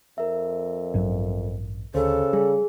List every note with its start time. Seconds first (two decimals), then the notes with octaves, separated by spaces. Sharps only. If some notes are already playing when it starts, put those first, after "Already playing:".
0.18 F2 A#4 E5
0.94 A1 G2 F#3
1.95 D2 C#3 A4 C5
2.33 G3 G#4